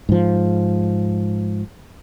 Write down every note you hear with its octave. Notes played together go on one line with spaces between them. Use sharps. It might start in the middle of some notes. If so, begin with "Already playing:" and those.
G#2 F3